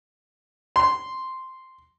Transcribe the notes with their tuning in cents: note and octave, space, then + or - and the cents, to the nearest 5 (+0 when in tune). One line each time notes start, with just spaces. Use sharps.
C6 -5